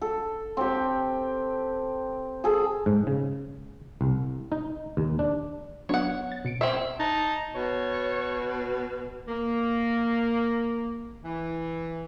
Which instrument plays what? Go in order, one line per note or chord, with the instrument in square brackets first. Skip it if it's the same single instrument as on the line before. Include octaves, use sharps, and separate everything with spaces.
[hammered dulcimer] A4
C4 G4
G#4 A4
[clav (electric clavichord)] G#2
C#3
C2
D#4
D#2
D4
[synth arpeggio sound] F#3 B3 D4 [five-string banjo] C#5 F#5
[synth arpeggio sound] A6
B2 C#7 D7
[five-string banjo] C4 C#4 E5
[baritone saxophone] D#4 [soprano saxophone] A5
[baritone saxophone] B2 [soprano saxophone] C#5
[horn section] A#3
E3